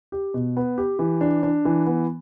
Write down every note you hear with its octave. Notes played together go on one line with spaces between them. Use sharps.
G4
B2
B3
G4
E3
D4
D4
E3
B3